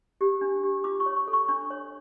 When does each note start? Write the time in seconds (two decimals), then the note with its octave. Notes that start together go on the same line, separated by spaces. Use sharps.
0.21 G4
0.41 D4
0.63 G4
0.84 F4 D6
1.00 C#6
1.06 C#5
1.16 C#6
1.28 A4
1.33 C#6
1.48 D4 C#6
1.70 C#5